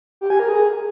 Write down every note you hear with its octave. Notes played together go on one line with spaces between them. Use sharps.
G4
G#5
A#4
G#4